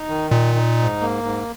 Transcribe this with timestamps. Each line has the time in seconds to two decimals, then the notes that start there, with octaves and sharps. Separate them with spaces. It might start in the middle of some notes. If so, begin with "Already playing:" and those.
Already playing: D#4
0.08 D#3
0.31 A#2 D#4
0.55 D#4
0.78 G#2
1.01 A#3
1.24 G#2